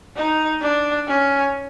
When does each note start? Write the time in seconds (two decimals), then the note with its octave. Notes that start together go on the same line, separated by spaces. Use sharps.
0.16 D#4
0.62 D4
1.07 C#4